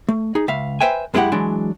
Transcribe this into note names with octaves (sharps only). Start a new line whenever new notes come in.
A3
D#4 G#4
C#2 E5 F5
B4 C5 E5 G5 G#5
F#2 G#3 C4 E4 G4 F#5
E3 F#3 G#3 D4